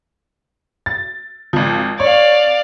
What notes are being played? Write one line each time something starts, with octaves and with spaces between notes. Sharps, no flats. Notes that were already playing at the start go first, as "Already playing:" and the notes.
A6
G#1 F3
C#5 D5 F5